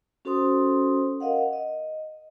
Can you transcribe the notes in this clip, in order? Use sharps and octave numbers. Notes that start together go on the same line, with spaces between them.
C#4 F#4 A4 C5 C6 D#6
A#4 D#5 F5 F#5
D#5